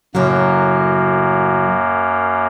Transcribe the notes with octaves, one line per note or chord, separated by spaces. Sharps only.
F#2 A2 C#3 F#3 A#3